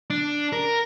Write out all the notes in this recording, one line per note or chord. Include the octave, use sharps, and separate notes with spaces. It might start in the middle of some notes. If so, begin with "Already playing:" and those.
D4
A#4